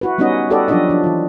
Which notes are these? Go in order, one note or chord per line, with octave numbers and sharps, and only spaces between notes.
E4 F#4 B4
G3 B3 C#4 D#4 F#4 D#5
F#4 G4 A4 B4 D5 D#5
F3 F#3 D4 F4 D5 D#5
F3 D4
E3 F4